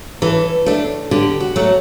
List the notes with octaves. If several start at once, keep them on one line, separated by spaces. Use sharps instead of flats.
E3 A4
A3 D4
D3 G4
F#4
F#3 A3